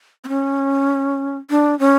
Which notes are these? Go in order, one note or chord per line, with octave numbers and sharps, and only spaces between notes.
C4
C#4
D4
C#4